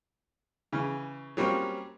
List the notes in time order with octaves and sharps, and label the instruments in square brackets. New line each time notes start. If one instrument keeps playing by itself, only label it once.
[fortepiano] C#3 E3
F#3 G3 A#3 C4 C#4